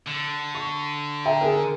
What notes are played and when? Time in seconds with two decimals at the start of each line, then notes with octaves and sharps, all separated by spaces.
0.07 D3
0.55 C#6
1.25 E5 G5 A#5
1.41 G#4 A#4